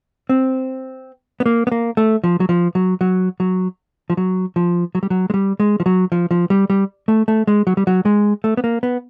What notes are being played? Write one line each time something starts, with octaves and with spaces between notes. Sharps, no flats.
C4
B3
A#3
B3
A#3
A3
F3
F#3
F3
F#3
F#3
F#3
F3
F#3
F3
F#3
G3
F#3
G#3
G3
G#3
F3
F#3
F3
F3
G3
G3
A3
A3
G#3
F#3
G3
F#3
G#3
A3
B3
A#3
B3